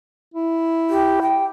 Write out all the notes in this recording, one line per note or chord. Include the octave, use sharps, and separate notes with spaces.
E4
G4
G5